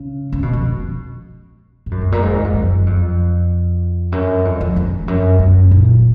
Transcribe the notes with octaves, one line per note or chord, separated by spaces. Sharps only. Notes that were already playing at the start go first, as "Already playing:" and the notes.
Already playing: C#3
C#3
B2
F2
G#2
F#2
G#2
A#2
G#2
F#2
F2
F#2
F2
F#2
F2
F2
F2
F#2
F#2
A#2